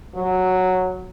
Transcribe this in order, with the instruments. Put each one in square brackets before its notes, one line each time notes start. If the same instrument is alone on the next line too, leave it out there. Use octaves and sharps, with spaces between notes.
[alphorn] F#3